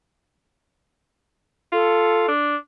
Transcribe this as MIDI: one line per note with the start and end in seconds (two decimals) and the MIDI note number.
1.72 2.27 65
1.72 2.29 69
2.28 2.56 62